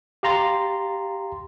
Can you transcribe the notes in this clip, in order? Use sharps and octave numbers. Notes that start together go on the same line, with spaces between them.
G4 F5 A#5 C6 A6